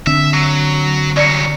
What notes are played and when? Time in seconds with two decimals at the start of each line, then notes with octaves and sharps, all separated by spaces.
0.07 D3 C4 D4 E5
0.34 F#3
1.17 C2 F#3 D5 C#7